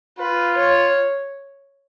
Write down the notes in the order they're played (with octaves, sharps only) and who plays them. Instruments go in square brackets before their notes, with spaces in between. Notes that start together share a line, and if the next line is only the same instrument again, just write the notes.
[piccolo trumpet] F4 [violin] B4
[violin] C#5